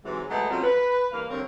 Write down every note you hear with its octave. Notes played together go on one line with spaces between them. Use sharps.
G#2 C3 E3 F#3
B2 F#3 G#3 A3 B3
F3 F#3 C4 C#4 F4
B4
E2 G2 A#3 F5
D3 G3 C4 A#4 C#5